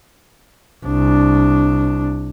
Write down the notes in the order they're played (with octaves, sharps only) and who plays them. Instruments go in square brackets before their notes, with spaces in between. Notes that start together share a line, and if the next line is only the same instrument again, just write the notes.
[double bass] C2 D4